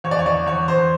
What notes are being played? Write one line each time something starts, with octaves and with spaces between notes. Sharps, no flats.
E2 C#5
D5
C#5
E2 D5
E2 C#5
E2 C5